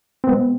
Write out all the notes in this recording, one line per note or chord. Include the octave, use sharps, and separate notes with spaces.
C4
B2 G#3 B3